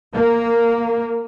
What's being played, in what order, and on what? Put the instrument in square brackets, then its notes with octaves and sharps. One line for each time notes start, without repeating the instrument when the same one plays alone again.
[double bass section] A#3